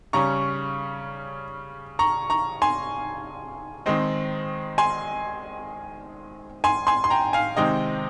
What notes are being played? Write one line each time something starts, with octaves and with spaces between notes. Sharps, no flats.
C#3 G3 C#4 A#5 C#6
A#5 C#6
A#5 C#6
G#5 C6
D#3 G#3 C4 D#4
G#5 C6
G#5 C6
G#5 C6
C6
G5 A#5
F5 G#5
C3 D#3 G#3 C4 D#4 D#5 G5